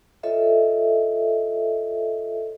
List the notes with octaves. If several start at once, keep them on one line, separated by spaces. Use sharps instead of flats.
F4 A4 C#5 D#5 E5